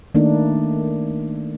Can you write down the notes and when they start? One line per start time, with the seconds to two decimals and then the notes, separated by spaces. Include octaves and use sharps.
0.14 D#3 A3 A#3 D4 D#4